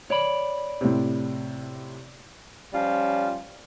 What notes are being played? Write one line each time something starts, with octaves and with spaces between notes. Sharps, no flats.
C#5 D5 B5
A2 C3
F3 G3 C#4 F4